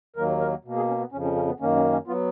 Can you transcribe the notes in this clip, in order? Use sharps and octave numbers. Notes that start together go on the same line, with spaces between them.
D#2 D#3 F#3 A#3 A#4
A#4
B2 A#3
G#4
C#4
B3
F2 C#3 F3 C#4
C#4
C#4
B3
F#2 D#3 A#3 C#4
C#4
C#4
F#3 B3 F4